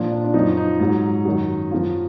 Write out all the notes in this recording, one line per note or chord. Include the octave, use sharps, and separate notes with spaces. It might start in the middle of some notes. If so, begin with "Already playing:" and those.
Already playing: A#2 F3 D4
D4
D4
F#2 F3 D#4
D#4
G#2 F#3
F#2 D#3 F#3
F#2 F3 F4